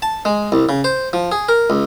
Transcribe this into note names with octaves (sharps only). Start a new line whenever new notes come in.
A5
G#3
C2
C#3
C5
F3
G#4
A#4
C#2